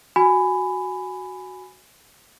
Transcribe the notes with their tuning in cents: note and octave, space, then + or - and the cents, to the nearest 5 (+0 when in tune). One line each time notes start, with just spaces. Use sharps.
F#4 +0 G#5 +0 B5 +15